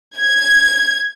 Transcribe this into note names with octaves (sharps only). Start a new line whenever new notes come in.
G#6